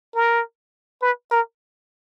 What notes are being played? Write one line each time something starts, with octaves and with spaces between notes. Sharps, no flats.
A#4
B4
A#4